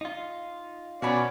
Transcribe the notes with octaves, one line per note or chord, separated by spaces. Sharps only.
D#4 F4
B2 C#4 F#4 D5 G#5 B5